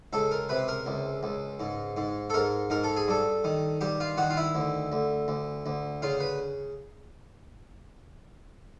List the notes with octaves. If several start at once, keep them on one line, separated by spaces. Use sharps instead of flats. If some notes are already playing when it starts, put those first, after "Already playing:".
C#2 A4
A#4
C3 B4
A#4
C#2
C#2
G#2
G#2
A4
G#2 A#4
G#2 A#4
A4
G#4
G2 A4
D#3
G2 G4
F4
D#3 F#4
F4
E4
D2
D2
D2
D2
C#3 F4
B4